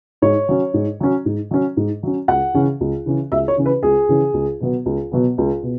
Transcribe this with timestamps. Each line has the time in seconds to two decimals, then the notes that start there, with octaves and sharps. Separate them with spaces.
0.22 G#2 C#5
0.49 F#3 C#4
0.74 G#2
1.00 F#3 C#4
1.25 G#2
1.51 F#3 C#4
1.77 G#2
2.03 F#3 C#4
2.28 C#2 F#5
2.54 C#3 E3 C#4
2.81 C#2
3.06 C#3 E3 C#4
3.32 C#2 E5
3.48 C#5
3.57 C#3 E3 C#4
3.66 B4
3.83 C#2 G#4
4.09 C#3 E3 C#4
4.34 C#2
4.61 B2 F#3 B3
4.86 C#2
5.12 B2 F#3 B3
5.38 C#2
5.63 B2